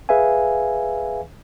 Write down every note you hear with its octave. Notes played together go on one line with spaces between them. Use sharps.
G#4 B4 E5 F5 G#5